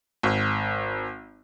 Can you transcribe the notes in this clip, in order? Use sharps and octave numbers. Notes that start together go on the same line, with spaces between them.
G#1